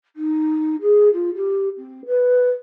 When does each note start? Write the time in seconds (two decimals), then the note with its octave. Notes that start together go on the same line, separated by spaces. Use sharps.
0.16 D#4
0.81 G#4
1.13 F4
1.36 G4
1.78 C4
2.06 B4